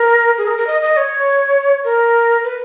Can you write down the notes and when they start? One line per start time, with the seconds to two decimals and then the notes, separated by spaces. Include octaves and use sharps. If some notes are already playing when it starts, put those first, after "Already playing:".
Already playing: A#4
0.38 G#4
0.48 A#4
0.58 A#4
0.67 D#5
0.82 D#5
0.97 C#5
1.85 A#4
2.44 B4